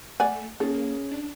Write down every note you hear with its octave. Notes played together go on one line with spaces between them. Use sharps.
A3 D5 F#5 G#5
A#3 C#4 G#4 A4
D4